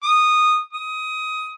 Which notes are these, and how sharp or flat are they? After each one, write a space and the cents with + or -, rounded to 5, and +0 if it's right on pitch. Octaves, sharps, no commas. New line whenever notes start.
D#6 -10
D#6 +20